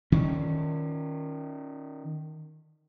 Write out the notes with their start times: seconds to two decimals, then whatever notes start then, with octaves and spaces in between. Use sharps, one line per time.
0.12 D#3 C#4